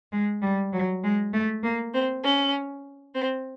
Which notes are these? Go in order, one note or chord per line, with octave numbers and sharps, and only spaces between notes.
G#3
G3
F#3
G#3
A3
A#3
C4
C#4
C4